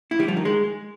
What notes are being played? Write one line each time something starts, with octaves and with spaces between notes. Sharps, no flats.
E4
G3
F3
D#3
G#3